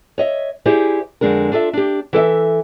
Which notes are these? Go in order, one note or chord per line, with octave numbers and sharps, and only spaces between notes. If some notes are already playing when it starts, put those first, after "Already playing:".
C#5 D#5 E5
E4 G4 G#4 C5 D5
F2 D3 G#3 D4 A#4
D4 F4 A4 E5
D4 G4
E3 A4 D5 E5